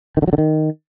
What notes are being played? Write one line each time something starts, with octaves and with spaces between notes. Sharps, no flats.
D#3
D3
F#3
D3
D#3